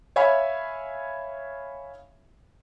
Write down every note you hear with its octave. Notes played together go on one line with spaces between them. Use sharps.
C#5 E5 F5 G#5 B5